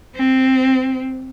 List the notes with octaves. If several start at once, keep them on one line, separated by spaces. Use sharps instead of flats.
C4